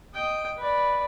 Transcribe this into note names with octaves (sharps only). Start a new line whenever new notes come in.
D#5 G5
B4 D5